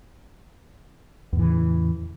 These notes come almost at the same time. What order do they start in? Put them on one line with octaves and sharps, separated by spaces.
E2 A2 E3 C#3